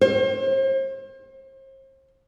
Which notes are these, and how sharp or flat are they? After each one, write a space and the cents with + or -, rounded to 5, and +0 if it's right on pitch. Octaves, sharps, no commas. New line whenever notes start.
C5 +40